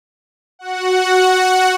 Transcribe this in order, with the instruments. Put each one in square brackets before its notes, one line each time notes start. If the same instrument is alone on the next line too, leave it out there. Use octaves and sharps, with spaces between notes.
[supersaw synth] F#4 F#5